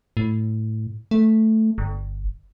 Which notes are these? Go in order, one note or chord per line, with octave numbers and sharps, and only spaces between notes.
A2
A3
G1